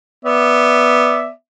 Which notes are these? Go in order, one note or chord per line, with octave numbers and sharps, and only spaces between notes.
B3 D5 E5